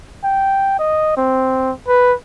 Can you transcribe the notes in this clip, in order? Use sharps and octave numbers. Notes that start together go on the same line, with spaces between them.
G5
D#5
C4
B4